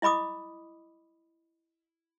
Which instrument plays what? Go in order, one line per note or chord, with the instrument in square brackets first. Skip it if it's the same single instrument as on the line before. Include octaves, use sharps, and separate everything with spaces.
[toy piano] E4 D#5 B5 D6 D#6